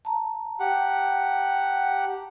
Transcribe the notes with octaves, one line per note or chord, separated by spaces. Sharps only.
A5 A#5
G4 F#5